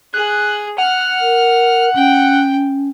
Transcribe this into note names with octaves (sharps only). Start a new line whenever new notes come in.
G#4 F#6
F#5 F6
A#4
C#4 G5